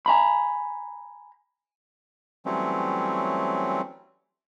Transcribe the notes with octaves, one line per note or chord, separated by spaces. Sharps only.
G#5 A#5 B5
E3 F#3 G3 A3 C4 C#4